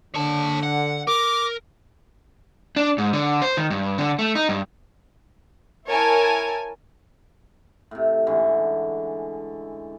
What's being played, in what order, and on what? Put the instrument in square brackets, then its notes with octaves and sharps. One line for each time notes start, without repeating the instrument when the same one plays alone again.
[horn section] D3 [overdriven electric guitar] C#5 A5
[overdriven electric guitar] F#5
[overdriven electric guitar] A#4 [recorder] D6
[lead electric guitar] D4
G#2
D3
C5
D#3
G2
D3
A3
D#4
G2
[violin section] E4 A#4 C#5 G#5 A5
[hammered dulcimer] A2 C3
G#2 D3 E3 C#4